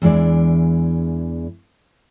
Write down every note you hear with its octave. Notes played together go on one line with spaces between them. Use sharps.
E2 E3 G#3 D4 D5